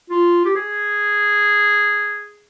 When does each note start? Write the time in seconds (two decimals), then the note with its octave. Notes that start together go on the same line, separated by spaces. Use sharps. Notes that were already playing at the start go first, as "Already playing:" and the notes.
0.10 F4
0.45 G4
0.55 G#4